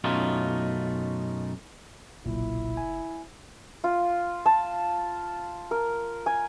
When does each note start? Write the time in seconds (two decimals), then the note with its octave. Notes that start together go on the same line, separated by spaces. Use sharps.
0.04 F#2 B2 A3 C#4 D#4 F4
2.26 F#1 B1 A#2 E4
2.77 G#5
3.84 F4
4.46 A5
5.71 A#4
6.26 G#5